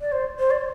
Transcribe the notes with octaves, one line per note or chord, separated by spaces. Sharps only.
D5
C5
C5
D5